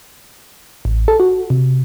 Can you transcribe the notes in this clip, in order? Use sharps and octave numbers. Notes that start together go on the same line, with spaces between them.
A1
A4
F#4
C3